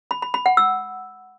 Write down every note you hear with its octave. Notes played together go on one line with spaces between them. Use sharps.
B5
B5
B5
F#5
E6